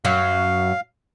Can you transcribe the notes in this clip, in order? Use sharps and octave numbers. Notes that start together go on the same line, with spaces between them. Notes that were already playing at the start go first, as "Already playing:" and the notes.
F#2 F#3 F5